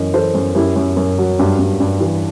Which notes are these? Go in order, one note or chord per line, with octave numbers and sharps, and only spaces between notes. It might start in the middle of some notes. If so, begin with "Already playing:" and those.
Already playing: F#2 E3 D#5
E3 A4 C5
F#2
F#2 E4 G4
F#2
F#2
F#3
G2
G2
G2
E3